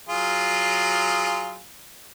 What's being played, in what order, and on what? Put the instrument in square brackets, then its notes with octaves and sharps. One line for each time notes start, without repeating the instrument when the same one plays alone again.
[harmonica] F#3 F4 G#4